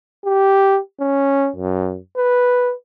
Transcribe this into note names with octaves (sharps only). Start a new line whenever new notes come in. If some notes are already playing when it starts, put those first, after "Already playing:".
G4
C#4
F#2
B4